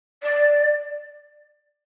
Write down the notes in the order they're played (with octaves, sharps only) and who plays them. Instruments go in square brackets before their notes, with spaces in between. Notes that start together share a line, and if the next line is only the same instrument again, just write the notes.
[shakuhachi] D5